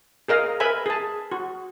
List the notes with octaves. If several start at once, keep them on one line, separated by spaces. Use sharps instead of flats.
G#4 A#4 D#5 F5
A#4 B4 E5 G#5 B5
G#4 A5
F#4